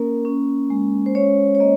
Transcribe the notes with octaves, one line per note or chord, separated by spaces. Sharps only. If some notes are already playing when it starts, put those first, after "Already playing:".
Already playing: A#3 C#4 A#4
C#4
G#3
C5
C#4 C#5
C#5
A#3 D#5